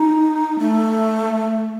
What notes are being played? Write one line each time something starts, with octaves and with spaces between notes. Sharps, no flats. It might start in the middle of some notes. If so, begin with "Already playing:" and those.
Already playing: D#4
A3